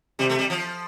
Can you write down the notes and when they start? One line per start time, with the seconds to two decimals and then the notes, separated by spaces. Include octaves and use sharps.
0.19 C3 G3
0.30 A3
0.39 G3
0.50 F3